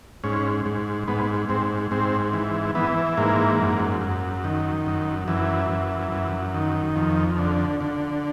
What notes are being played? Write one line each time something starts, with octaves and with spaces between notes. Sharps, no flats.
G#2 C#4
G#2
G#2 B3
G#2 C4
G#2 C4
E3
E3 B3
G#2 A#3
F#2
F#2
D#3
F#2
F#2 E3
F#2
F#2
D#3
F2
D3
D3